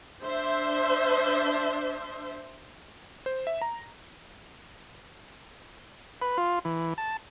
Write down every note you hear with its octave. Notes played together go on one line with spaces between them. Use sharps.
D4 C5 E5
C5
E5
A#5
B4
F4
E3
A5